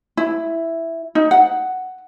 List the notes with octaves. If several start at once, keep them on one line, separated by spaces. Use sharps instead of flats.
E4
D#4
F#5